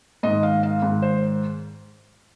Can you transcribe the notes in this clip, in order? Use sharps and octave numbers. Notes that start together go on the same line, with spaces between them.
G#2 D#3 D#5
F5
F5
G#2 D#3
C5